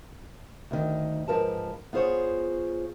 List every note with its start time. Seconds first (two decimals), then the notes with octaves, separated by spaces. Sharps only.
0.71 D2 D#3
1.28 G#2 F3 A#4 B4 A5
1.93 B3 F4 G#4 C5 C#5